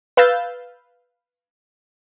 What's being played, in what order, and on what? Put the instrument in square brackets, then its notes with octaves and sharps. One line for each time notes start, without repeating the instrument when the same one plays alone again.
[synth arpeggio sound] B4 F5 E6 G6 A6